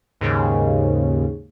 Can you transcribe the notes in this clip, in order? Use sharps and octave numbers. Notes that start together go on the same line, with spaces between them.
D#2 G#2 C#3